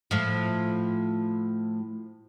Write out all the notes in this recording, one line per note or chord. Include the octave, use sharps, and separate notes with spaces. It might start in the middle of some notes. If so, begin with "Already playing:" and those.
A2 F3